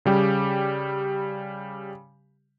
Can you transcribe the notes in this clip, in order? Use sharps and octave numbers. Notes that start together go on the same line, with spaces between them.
C#3 G3 G4